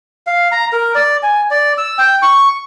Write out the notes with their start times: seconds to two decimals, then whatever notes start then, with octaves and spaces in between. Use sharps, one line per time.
0.27 F5
0.52 A#5
0.73 A#4
0.95 D5
1.23 G#5
1.51 D5
1.78 E6
1.98 G5
2.22 C#6